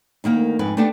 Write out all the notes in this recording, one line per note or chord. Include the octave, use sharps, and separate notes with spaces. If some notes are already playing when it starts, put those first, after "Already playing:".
D2 D#3 A#3 F5
F2 G#2 B4 G#5
A3 B3 D4 G4 A5